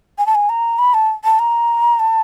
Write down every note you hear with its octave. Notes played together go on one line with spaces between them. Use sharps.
G#5
A5
G#5
A#5
B5
A5
A5
A#5
A5